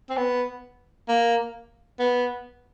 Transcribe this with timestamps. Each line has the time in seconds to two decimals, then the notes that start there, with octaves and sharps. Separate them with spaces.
0.10 C4
0.17 B3
1.08 A#3
2.00 B3